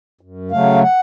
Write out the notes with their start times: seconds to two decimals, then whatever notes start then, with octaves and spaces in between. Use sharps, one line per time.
0.21 F#2
0.51 C#3 F#3 A3 F5
0.82 F#5